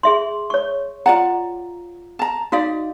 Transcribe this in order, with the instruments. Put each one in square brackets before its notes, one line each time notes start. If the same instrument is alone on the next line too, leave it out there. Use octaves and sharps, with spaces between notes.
[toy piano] G#4 E5 C6
C#5 C#6
[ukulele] F4 D5 F#5 [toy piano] A#5
[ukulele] A5 A#5
[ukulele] D#4 D5 [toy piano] F#4 F5